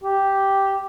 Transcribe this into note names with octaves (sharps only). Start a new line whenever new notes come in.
G4